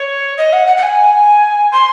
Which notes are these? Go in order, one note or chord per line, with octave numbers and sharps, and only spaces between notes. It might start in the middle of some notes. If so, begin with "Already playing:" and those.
Already playing: C#5
D#5
F#5
F#5
F#5
G#5
C6